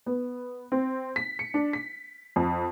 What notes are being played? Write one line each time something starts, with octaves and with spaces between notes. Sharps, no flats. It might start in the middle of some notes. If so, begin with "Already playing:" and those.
B3
C4
B6
C#7
D4
B6
F2